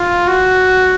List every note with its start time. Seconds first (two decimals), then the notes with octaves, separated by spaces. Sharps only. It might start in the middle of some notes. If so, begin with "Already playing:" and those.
Already playing: F4
0.28 F#4